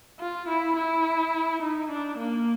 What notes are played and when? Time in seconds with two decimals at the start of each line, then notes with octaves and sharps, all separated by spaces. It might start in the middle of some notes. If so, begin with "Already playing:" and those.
0.20 F4
0.48 E4
0.76 E4
1.62 D#4
1.90 D4
2.18 A#3